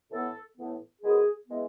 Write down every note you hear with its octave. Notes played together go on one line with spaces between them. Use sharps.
A2 E3 B3 A4
A2 E3 B3
F#2 E3 G#3 B3 G#4
E3 G#3 B3